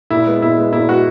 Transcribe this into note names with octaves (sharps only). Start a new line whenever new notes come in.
A#2 E4
G#3 B3
A#2 E4
G#3 B3
A#2 E4
G#3 B3 F#4